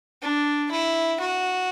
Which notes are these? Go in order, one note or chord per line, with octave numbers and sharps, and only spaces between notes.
D4
E4
F#4